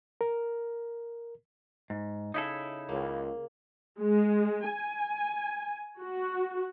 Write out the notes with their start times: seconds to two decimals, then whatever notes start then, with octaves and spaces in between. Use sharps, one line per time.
0.21 A#4
1.90 G#2
2.34 C#3 D#4 E4 A4
2.89 C#2 A#3
3.99 G#3
4.69 G#5
6.00 F#4